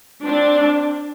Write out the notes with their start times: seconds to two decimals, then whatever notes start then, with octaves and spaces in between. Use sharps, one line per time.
0.25 C4 D4